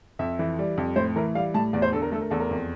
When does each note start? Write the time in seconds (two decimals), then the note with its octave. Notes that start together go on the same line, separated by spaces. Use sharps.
0.19 F2 E5
0.39 E3
0.59 G3
0.78 F2
0.96 A2 C5
1.16 E3 A#4
1.35 G3 F5
1.54 A2 A5
1.73 E2 D5
1.82 C5
1.92 D3 A4
2.02 A#4
2.12 A3 A4
2.21 A#4
2.31 E2 A4
2.40 A#4
2.51 F2